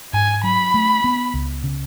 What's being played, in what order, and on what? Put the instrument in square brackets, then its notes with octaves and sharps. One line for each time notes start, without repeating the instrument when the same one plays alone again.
[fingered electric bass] G#2 [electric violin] G#5
[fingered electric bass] F#3 [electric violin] B5
[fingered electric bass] A3
B3
C#2
C#3